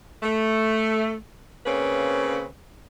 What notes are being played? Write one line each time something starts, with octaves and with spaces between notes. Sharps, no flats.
A3
C#3 A#3 C4 C#4 B4